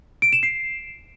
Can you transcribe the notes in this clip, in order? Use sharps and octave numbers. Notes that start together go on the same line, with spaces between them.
D7
E7
C7